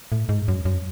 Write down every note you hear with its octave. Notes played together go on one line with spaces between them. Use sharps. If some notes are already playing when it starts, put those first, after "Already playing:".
A2
G#2
F#2
F#2